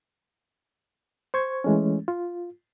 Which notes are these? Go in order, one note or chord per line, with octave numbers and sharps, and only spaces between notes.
C5 C#6 G#6
E3 G#3 A3 C#4
F4